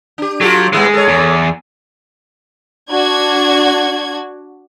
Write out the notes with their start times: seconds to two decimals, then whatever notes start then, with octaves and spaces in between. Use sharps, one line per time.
0.18 D4 G4
0.41 F#3 F4 G4 A4
0.73 A2 G3 G#3 B3
0.94 A4 C#5
1.08 E2
2.90 D4 F#4 G#6